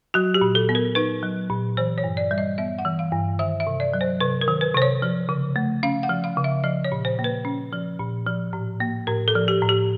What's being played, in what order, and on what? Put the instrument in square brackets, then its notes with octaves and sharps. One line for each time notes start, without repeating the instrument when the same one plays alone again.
[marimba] F#3 F#4
G4
A#2
A4
B3
A#4
D#4 B4
F#3
A#2
E3 C5
C#5
G2
D5
G3
D#5
B3 E5
F#5
E3
F5
G2
D#3 E5
E5
C3
D5
F#3
C5
C3 B4
A#4
D#3
B4
C3 C5
C#5
F3
C#3
A3
C#4 F5
F#5
F3
F5
C#3
E5
F3 D#5
C#5
A#2
C5
A#3
B4
C#4
F3
A#2
F3
A2
A#3
A2 A#4
A4
F3
G4
A2
G4